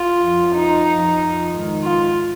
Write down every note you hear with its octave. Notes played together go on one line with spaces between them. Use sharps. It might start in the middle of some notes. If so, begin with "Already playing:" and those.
Already playing: F4
F2 F3
D#4
F2 F3
G#2 D#3
F4